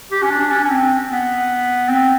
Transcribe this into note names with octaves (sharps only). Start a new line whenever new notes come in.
G4
C#4
D4
C#4
C#4
C4
B3
C4